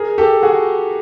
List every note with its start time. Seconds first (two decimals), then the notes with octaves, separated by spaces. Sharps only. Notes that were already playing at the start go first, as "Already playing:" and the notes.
Already playing: G#4 A#4
0.18 G4 A4
0.43 F#4 G#4